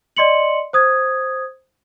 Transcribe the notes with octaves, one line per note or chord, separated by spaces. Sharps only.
D5 D#5 C6 C#7 F#7
C5 D#6 G#6